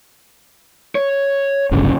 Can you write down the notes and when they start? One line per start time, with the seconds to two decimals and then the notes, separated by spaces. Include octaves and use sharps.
0.95 C#5
1.71 D1 G1 C#3